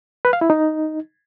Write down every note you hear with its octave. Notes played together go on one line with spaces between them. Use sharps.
B4
F5
E4
D#4